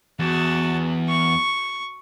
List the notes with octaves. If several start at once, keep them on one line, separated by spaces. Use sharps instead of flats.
E2 F#4 A5
C#6